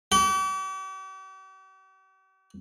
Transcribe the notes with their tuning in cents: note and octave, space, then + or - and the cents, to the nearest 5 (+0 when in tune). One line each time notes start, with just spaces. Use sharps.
G4 -45